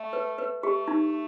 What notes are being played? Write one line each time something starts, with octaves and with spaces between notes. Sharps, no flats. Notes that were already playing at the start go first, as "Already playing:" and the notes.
Already playing: A3
B4
B4
A3 G4
D#4